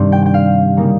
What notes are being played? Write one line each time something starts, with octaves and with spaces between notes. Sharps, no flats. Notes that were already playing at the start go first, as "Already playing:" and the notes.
Already playing: G2 C3 D#3 G3 C4 D#4
G5
G5
F5
C#3 G3 A#3 D#4